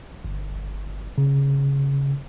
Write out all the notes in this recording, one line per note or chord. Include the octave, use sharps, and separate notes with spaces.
G1
C#3